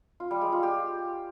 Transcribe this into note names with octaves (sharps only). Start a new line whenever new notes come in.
F4
G3
G#3
F4
G4